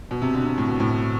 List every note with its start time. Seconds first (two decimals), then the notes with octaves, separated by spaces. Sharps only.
0.11 B2
0.22 C3
0.34 D3
0.45 C3
0.58 A2
0.68 B2
0.80 A2